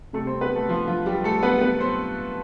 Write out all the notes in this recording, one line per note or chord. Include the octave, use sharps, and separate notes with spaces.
C3 G3 A3 A4
C4 C5
B3 B4
A3 A4
F3 F4
F3 F4
G3 G4
A3 A4
B3 B4
B3 B4
C4 C5